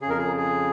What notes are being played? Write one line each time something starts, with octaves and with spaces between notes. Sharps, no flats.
F2 C#3 G#4 A#4
G#4
G#4